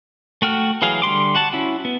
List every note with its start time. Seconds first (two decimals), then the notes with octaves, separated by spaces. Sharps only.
0.42 A3 F#4 G5 F6
0.82 E3 F#3 G#4 F5
1.02 D3 G3 C6 D6
1.35 F#4 F#5 A5
1.53 C#4 E4 F#4
1.85 B3